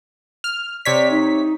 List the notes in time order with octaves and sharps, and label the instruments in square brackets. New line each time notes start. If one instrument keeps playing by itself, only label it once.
[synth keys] F6
[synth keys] C3 C#5 B6 [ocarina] D5
[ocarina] D#4